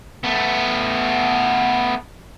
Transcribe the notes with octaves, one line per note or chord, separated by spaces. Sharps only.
A3 B3